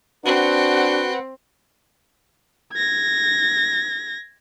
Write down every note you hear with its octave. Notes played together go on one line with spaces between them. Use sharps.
C4 D4 F#4 B4 F#5
G#6 A#6